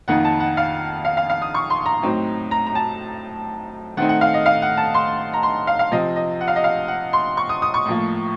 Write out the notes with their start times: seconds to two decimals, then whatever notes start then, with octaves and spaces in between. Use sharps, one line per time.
0.08 F2 D#3 A#3 D#4 F#5
0.25 A5
0.40 F#5
0.57 F5
1.05 F5
1.17 F5
1.30 F5
1.42 D#6
1.54 C#6
1.70 C6
1.86 A#5
2.03 A2 F#3 C4 D#4
2.51 A#5
2.67 A#5
2.75 A5
3.97 D#3 A3 C4 D#4 F#5
4.09 F#5
4.21 F5
4.34 D#5
4.46 F5
4.62 F#5
4.77 A5
4.94 C6
5.34 A#5
5.43 C6
5.67 F5
5.79 F5
5.92 C3 F3 C4 D#5
6.16 D#5
6.41 F#5
6.48 F5
6.56 D#5
6.64 F5
6.88 F#5
7.13 C6
7.37 C#6
7.49 D#6
7.62 D#6
7.74 C#6
7.85 A2 F3 A#3